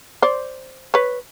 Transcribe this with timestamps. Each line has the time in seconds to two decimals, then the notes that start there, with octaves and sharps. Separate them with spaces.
0.22 C5 D5
0.94 B4 C#5